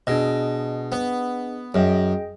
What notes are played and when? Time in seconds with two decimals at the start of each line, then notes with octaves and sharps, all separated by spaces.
0.07 B2 D4 G#4 D#5
0.92 B3
1.74 F#2 G#4 D#5 G5